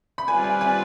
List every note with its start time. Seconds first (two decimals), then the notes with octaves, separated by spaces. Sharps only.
0.18 B5
0.28 G3 C4 F4 B4 D5 G#5
0.44 G#5
0.61 G#5